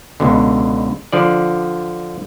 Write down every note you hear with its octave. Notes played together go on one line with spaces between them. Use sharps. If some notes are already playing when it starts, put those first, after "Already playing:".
C#2 B2 D3
D3 F3 D5